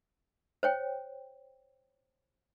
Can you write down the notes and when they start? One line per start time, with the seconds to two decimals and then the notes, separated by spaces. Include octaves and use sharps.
0.63 C5 C#5 G5